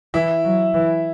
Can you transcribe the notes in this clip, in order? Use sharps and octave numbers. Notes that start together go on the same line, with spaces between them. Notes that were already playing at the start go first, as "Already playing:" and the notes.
E3 E4 E5
F#3
E3